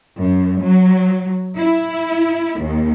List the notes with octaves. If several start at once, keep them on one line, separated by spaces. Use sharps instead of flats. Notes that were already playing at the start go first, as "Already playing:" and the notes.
F#2
F#3
E4
D#2